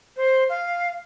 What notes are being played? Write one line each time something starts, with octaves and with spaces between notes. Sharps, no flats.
C5
F5